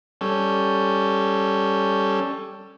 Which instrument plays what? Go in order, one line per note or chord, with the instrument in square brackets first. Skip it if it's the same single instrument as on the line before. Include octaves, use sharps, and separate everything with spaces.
[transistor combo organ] G3 C#4 A4